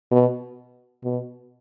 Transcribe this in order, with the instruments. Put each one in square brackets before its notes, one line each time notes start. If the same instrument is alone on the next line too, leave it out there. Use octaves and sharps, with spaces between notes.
[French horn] B2
B2